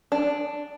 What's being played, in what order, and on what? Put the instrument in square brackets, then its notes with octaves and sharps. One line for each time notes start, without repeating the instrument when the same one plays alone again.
[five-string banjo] D4